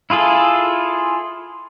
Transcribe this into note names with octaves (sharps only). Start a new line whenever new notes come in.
E4 F4 G#4 A4